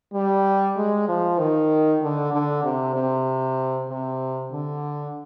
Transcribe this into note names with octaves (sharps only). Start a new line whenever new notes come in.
G3
G#3
F3
D#3
D3
D3
C3
C3
C3
D3